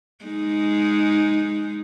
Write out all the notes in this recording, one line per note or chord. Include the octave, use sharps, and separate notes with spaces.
G#3 D#4